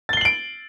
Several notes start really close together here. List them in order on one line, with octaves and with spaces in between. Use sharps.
A6 G7 C7 F#7 D7